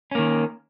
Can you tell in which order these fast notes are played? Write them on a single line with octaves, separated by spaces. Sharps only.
C#4 A#3 D#3